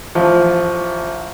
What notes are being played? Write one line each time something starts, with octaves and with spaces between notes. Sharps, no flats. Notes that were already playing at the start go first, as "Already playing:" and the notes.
A1 F3